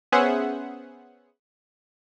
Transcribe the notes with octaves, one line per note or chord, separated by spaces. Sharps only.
B3 C#4 G#4 C5 E5 F#5